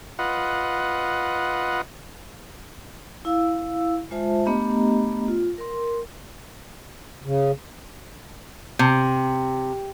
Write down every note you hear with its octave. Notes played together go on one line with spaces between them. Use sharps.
F4 B4 D#5 F#5
E4 F5 E6
G#3 F4 C5 E5 A5
A3 B3 D4 G4 D#5 A#5
F4
A#4 C6
C#3
C3